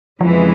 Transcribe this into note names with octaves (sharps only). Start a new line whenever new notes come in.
F2 C#3 E3 F3 G#3